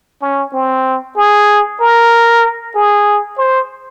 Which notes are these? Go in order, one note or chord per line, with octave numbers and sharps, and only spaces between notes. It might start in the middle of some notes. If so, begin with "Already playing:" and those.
C#4
C4
G#4
A#4
G#4
C5